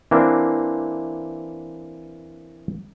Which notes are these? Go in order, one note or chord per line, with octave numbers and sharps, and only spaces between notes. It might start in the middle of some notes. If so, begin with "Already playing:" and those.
E3 A#3 C4 D4